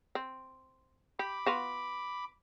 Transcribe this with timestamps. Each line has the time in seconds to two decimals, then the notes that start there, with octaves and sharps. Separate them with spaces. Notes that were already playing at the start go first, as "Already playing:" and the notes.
0.15 C4
1.19 G4 B5 D6
1.46 B3 F4 F#4